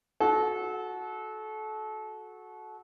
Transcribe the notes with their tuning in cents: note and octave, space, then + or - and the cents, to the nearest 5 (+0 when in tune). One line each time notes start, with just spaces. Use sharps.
F#4 -10 A4 -30